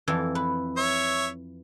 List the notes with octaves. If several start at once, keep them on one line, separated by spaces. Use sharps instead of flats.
F2 E3
B4
C#5 E5